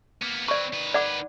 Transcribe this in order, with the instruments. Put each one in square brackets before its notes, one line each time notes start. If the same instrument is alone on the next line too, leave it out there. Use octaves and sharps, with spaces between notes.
[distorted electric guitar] A#3 B3
[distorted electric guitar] C4 B4 [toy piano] D5 C#6
[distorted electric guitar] D#3 B4
[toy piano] D5 F#5 D6